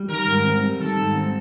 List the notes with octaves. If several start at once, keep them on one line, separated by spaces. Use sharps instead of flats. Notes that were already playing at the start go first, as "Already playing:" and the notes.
Already playing: G3
D#3 A#4
G#2
C4
G3
D#3 A4
G#2
C4